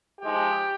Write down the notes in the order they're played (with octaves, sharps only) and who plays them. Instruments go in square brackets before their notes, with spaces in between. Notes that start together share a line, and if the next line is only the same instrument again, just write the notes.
[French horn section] F3 G#3 D#4 G4